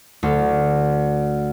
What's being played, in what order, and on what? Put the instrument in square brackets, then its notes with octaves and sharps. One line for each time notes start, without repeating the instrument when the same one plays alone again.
[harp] D2